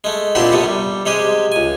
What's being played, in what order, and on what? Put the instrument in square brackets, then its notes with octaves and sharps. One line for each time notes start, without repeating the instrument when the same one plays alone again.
[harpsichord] G#3 A3
A#2 C4 D4 E4 F#4 G4
C3 A3 B3
G3
C3 G#3 G4 G#4
C#2 G#5